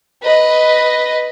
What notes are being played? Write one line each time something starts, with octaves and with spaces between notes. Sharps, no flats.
B4 D#5